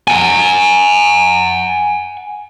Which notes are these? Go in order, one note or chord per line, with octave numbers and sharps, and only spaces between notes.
F#5 G#5